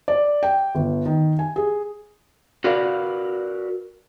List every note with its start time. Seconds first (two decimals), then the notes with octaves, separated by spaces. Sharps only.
0.08 D5
0.43 G5
0.75 G1
1.06 D#3
1.39 G#5
1.56 G#4
2.64 F#4 A#4 B4 D5 F5